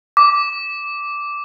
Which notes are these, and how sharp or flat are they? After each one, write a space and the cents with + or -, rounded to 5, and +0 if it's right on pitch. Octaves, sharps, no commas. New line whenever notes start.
D6 -10